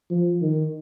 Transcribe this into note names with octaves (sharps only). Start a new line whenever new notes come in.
F3
D#3